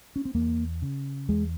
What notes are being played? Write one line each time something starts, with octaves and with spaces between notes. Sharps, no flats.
C#4
C4
E2 A#3
C#3
E2 G#3